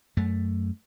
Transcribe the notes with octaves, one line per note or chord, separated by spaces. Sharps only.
F#2 A3